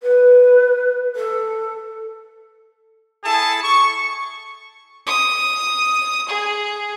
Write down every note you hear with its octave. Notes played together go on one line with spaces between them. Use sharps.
B4
A4
E4 G#4 A4 A5
C#6
D#6
G#4